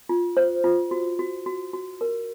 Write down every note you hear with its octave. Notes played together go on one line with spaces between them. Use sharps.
F4
C5
F4
F#4
F#4
F#4
F#4
A#4